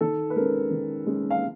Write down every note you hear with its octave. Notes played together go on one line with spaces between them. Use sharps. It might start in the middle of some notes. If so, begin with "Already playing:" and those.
D#3 A4
B4
G#3 C#4 A#4
D#3
G#3 C#4
F5